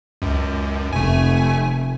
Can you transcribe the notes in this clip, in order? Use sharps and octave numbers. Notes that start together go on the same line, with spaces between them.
C#2 F#2
F1 A3 G#5